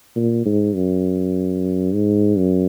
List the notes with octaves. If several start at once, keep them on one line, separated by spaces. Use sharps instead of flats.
A#2
G#2
F#2
G#2
F#2